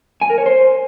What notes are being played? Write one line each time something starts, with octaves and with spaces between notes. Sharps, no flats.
G#5
A#4
C#5
C5